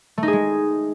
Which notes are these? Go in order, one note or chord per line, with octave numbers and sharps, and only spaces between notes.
A3
D#4
G#4
G#3